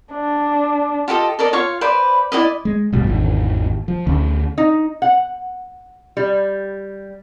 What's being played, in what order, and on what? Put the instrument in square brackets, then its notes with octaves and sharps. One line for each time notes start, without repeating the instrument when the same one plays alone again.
[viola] D4
[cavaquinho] F4 G4 A4 D#5
A4 A#4 D5 D#5
F4 C#5 F5 C#6
B4 C5 D5 B5
E4 F#4 D5 D#5
[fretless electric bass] G#3
[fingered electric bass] E1 G#2 [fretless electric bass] A#1 B2 G3
[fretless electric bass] G#1 [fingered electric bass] E2 D3 D#3
[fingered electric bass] F3
[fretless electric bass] D2 [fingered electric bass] D3 C#4
[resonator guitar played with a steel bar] D#4
F#5
G3